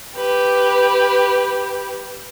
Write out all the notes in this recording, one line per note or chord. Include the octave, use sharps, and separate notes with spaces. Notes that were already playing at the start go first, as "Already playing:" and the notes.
G4 B4